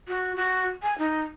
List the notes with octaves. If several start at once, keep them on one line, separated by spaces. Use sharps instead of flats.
F#4
F#4
G#5
D#4